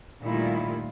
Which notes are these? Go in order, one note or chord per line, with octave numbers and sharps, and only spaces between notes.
A#2 D#3 G3 A3 E4 F4